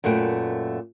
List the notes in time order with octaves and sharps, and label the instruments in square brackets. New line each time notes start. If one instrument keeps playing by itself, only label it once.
[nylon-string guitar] F#2 A#2 A3 B4 G5